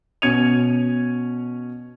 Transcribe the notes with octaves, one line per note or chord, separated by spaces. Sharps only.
B2 C#4 G#6 C#7 D#7 F7